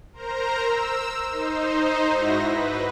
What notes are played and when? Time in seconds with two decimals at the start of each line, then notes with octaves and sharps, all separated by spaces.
0.13 A#4 C5 A#5
0.61 E6
1.31 D#4 C5
2.12 G#2 E4 F#4 E5 A#6
2.46 B4